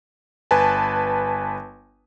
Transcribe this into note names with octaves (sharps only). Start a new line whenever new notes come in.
G1 B4 G#5 A5